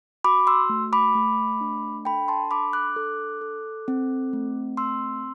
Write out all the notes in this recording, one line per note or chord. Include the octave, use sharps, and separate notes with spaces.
F#4 B5 D6
C6 E6
A3
B5 D6
A3
D4
A4 G5 B5
A5 C6
D4 B5 D6
D6 F#6
A4
A4
C4
A3
C4 C6 E6